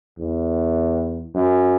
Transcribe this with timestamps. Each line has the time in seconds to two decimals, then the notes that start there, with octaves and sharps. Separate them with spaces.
0.18 E2
1.34 F#2